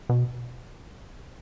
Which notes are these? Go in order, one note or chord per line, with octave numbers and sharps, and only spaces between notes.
B2